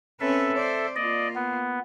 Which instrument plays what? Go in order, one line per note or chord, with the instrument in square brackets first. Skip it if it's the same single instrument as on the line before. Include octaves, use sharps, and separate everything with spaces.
[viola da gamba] C4 C#4 B4 [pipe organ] A4 E5
[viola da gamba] C5 D5
[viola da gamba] A#3 F4 [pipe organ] D5 D#5
[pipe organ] B3